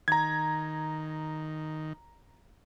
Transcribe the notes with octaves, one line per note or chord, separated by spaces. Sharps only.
D#3 A#5 G#6